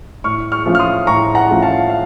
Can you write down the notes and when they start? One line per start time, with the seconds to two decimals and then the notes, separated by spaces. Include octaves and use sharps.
0.24 A2 C#6 F6
0.52 C#6 F6
0.66 F3 A3 C#4 F4
0.75 F6
0.79 C6 D#6
1.07 A2 A#5 C#6
1.35 F#5 A#5
1.48 F3 A3 C#4 F4
1.62 F5 A5
1.90 F5